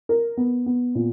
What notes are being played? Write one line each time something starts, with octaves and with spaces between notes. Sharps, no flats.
A#4
B3
B3
A#2